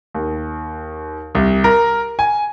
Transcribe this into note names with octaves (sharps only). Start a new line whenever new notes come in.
D#2
C2
A#4
G#5